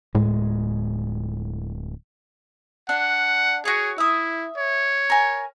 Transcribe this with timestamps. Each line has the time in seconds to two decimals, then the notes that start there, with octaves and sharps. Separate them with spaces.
0.15 D1 A2 G#3
2.89 D4 F#5
3.65 F#4 G#4 C#5
3.98 E4 E5 D#6
4.57 C#5
5.10 A#4 G#5